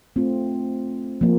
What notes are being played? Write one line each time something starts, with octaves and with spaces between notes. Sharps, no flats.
A3 C4 F4
F3 A#3